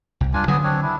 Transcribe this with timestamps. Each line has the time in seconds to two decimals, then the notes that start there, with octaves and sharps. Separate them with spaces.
0.21 C2
0.34 G2 D4 F4 G#5
0.48 D3 F#3 B3 G#5 D#6
0.63 C4 D4 C#5
0.82 D4 E4